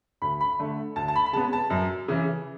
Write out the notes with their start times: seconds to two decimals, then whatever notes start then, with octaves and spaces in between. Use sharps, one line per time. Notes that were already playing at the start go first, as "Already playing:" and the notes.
0.22 D2 B5
0.41 B5
0.59 D3 A3
0.96 D2 A5
1.08 A5
1.16 B5
1.26 B5
1.33 C#3 G#3 B3 A5
1.53 A5
1.70 F#2
2.08 C#3 E3